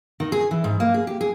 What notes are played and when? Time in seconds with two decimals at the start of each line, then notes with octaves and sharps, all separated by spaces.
0.20 D#3
0.32 G#4
0.51 E3
0.64 G#2
0.80 A#3
0.94 G#4
1.07 G4
1.21 G#4